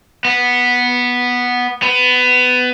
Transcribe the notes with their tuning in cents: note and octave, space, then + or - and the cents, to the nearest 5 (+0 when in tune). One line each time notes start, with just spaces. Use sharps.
B3 -5
B3 +20